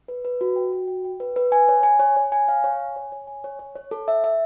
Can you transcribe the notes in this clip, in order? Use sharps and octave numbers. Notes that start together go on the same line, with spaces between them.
B4
B4
F#4
G5
F#4
G5
G5
B4
B4
G#5
C#5
G#5
C#5
C#5
G#5
F5
C#5
G#5
C#5
C#5
G#5
C#5
C#5
C#5
A4
E5
E5